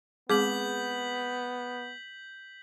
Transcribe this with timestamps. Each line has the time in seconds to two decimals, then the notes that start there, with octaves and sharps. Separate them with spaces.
0.30 G#3 B3 C4 G#4 D6 G6 B6 F#7